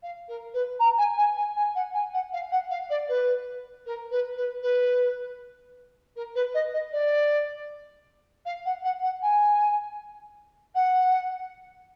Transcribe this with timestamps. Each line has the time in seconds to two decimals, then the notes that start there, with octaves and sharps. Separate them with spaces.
0.03 F5
0.28 A#4
0.54 B4
0.79 A#5
0.98 G#5
1.17 G#5
1.36 G#5
1.56 G#5
1.75 F#5
1.94 G#5
2.13 F#5
2.33 F5
2.51 F#5
2.70 F5
2.90 D5
3.09 B4
3.86 A#4
4.11 B4
4.37 B4
4.62 B4
6.16 A#4
6.35 B4
6.54 D#5
6.73 D#5
6.92 D5
8.45 F5
8.65 F#5
8.84 F#5
9.02 F#5
9.22 G#5
10.75 F#5